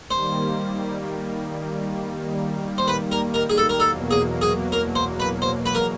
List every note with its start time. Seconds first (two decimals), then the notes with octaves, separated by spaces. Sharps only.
0.11 D#3 G3 A#3 C5
2.78 C5
2.88 B4
3.12 A#4
3.34 A#4
3.50 G#4
3.58 A4
3.69 A#4
3.80 E2 B2 F#3 A#3 A4
4.11 G#4
4.42 G#4
4.72 A#4
4.96 C5
5.20 B4
5.42 C5
5.66 B4
5.75 A#4